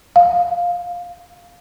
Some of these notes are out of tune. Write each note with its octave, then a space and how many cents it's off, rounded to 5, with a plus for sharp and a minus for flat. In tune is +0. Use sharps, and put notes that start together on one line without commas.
F5 +10